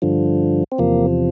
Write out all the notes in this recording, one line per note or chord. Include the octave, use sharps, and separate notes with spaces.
G2 D3 F3
C4
E2 C3 F3 A#3